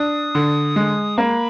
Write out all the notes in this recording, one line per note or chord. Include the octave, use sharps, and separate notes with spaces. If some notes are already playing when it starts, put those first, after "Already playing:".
Already playing: D4 D#6
D3
G#3
A#3 B5